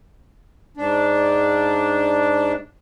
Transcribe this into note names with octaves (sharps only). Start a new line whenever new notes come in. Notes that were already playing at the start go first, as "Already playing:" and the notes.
G#2 D4